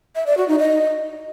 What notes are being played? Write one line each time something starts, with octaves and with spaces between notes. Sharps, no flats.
E5
D5
F#4
D#4
D#5